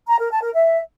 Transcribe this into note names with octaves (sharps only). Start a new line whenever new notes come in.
A#5
A#4
A5
A#4
E5